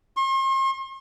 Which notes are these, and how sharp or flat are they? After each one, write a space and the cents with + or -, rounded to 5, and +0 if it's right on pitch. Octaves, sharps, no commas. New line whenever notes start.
C6 +45